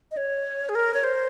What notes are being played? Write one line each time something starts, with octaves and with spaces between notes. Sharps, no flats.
D#5
C#5
G#4
A#4
C#5
C5